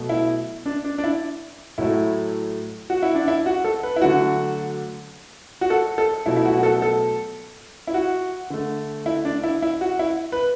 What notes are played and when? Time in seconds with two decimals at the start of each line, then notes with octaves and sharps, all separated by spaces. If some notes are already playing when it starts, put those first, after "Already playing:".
Already playing: B2 F#3 A3
0.09 E4
0.66 D4
0.84 D4
0.98 D4
1.04 E4
1.78 A2 F#3 A3 E4
2.90 F#4
3.02 E4
3.15 D4
3.28 E4
3.46 F#4
3.65 A4
3.83 B4
3.96 E4
4.02 D3 F#3 A3 F#4
5.61 F#4
5.70 A4
5.98 A4
6.26 B2 F#3 A3 E4
6.37 E4
6.45 F#4
6.57 F#4
6.63 A4
6.82 A4
7.88 E4
7.94 F#4
8.50 D3 A3
9.06 E4
9.25 D4
9.44 E4
9.62 E4
9.81 F#4
9.99 E4
10.32 B4